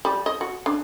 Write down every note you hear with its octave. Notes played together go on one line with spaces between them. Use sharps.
G3
D#5
F#4
D4